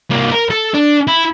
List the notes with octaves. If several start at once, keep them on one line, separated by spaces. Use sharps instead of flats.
C2 A#3
A#4
A4
D4
E4